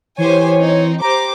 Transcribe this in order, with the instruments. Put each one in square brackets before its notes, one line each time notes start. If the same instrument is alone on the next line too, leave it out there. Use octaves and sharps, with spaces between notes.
[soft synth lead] E3 [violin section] G4 C5 G#5 [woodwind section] C#5
[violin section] C4 D#4
[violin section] G4 C5 D6 [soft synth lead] A#5